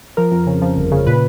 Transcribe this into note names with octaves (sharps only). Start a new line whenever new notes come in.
F3 A#4
F2
C#3
F3
G1
C#3
A#2 B4